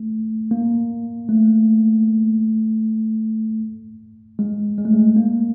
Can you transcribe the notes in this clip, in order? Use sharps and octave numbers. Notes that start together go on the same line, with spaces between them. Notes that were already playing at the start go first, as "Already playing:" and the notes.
Already playing: A3
A#3
A3
G#3
G#3
A3
G#3
A#3